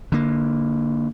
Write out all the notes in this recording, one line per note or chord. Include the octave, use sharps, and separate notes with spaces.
D3 A#3